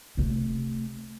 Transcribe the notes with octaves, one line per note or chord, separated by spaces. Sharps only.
C3 A3